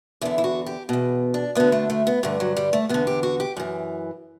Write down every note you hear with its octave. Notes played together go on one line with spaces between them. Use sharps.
E2 D3 E4
E4
F#4
G4
E2 B2
D4
D2 D3 B3
A3
A3
B3
G2 D3 A3
F#3
G3
A3
E2 D3 B3
G4
F#4
G4
F#2 E3